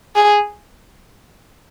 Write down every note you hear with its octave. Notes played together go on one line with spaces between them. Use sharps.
G#4